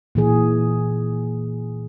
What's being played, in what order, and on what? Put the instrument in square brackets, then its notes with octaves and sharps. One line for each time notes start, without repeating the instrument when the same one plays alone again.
[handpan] A#2 E3 G#4